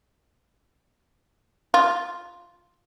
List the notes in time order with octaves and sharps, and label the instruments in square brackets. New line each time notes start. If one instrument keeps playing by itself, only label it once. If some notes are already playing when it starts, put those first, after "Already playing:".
[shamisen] F4